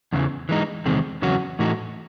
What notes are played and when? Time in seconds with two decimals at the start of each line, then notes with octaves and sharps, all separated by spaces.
0.13 E2 C#3 E3
0.49 E3 G#3 D#4
0.85 E2 C3 D#3 G#3 C4
1.22 E2 C#3 F#3 C#4 F#4
1.59 A2 E3 A3 D#4 F#4